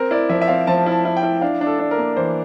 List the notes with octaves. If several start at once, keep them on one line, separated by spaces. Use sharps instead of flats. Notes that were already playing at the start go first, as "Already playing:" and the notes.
Already playing: C4 A#4
E4 D5
F3 E5
E5
C4 F5
F3 A5
E4
A5
E4
G5
E4
D4 F5
D4
A4
D4
A#4
A#3
E3 C5